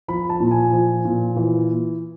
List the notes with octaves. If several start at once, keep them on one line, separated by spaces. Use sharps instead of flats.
F3 B5
A5
A#2
G#5
F3
A#2
E3